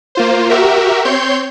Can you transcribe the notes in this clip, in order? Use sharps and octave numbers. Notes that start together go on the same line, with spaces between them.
A#3 F4 C5
F#4 G4 A#4 E5
C4 C#5 C6 G6